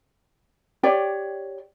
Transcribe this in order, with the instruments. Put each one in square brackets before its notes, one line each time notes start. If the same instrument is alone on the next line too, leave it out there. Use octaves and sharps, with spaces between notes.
[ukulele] G4 C#5 D5 G5